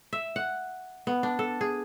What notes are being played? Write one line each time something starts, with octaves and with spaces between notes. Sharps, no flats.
E5
F#5
B3
D4
A4
G#4